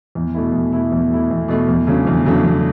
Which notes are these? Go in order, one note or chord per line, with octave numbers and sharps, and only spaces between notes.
E2
B2 A3 E4
E2
B2 A3 E4
E2
B2 A3 E4
E2
B2 A3 E4
E2
C#3 F#3 A3 D4
E2
C#3 F#3 A3 D4
E2